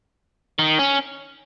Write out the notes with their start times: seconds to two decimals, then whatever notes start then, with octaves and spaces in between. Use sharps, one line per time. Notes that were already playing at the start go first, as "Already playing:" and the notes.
0.59 D#3
0.79 C#4